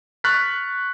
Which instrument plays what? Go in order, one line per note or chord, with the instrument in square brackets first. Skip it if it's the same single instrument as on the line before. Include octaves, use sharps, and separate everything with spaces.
[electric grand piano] C#6 F6 F#6 A6 B6